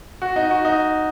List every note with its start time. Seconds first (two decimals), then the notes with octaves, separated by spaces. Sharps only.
0.22 F#4
0.36 D#4
0.51 F#4
0.65 D#4